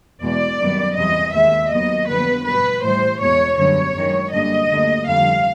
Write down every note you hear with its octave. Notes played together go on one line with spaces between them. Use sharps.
E2 B2 G#3 B3 D5
F#2 D#3 G3 B3
E2 C3 E3 G3 D#5
D#2 D#3 G#3 E5
D#2 D#3 F#3 B3 D#5
F2 D3 G3 B3 B4
B2 G3 B3 B4
A2 E3 G3 C5
E2 B2 G#3 C#5
F#2 D3 G3 B3 C#5
F#2 D#3 G#3
F#2 D3 G3 A#3 D#5
D2 D3 G3 A#3
F2 D3 G3 F5